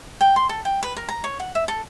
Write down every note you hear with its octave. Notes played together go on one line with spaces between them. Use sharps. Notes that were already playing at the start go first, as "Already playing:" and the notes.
G5
C6
A4
G5
B4
A#4
A#5
C#5
F#5
E5
A4